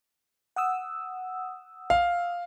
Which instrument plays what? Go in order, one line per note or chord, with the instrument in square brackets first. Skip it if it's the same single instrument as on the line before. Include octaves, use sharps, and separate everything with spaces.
[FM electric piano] F#5 D#6 E6
[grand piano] F5